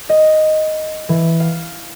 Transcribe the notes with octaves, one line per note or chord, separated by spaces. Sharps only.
D#5
E3
F5